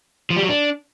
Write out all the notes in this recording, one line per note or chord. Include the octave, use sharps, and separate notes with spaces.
F3
G3
F#3
D4